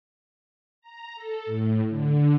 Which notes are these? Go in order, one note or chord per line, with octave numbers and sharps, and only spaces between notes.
A#5
A4
A2
D3